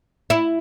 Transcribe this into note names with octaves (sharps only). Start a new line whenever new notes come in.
E4